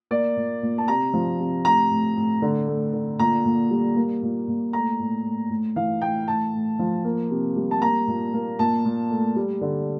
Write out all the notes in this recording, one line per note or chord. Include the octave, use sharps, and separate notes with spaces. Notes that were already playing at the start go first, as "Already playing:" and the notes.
A#3 D5
A#2
A#2
A5
C3 A#5
F3
C3
A2 A#5
A2
A2
D3
A3
D3
A#2 A#5
A#2
G3
A#3
A#2
A#2
A3 A#5
A2
A2
A2
E3 F5
A2 G5
A2 A5
A2
F3
A#3
C3
G3
A5
A#3 A#5
A#2
A#3
A#2 A5
A#2
A3
G3
D3